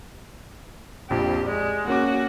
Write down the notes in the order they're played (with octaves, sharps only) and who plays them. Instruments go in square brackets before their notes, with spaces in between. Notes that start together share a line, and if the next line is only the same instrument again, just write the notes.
[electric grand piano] A#1 F2 [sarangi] G4
[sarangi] G#3 [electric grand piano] D5
[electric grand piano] A#3 C#4 D6 [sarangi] F#4